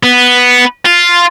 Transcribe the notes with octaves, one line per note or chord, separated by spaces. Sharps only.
B3
F4